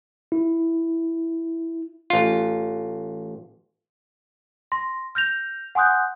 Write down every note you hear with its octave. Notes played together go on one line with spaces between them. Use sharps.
E4
A1 F4
C6 A#6
F6 G6 A#6 F7
F#5 G#5 C6 D#6 F#6 G6